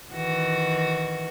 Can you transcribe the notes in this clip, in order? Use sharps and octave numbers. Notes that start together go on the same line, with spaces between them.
D#3 E3 F#4